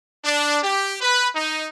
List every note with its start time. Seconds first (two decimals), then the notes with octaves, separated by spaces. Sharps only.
0.24 D4
0.63 G4
1.01 B4
1.35 D#4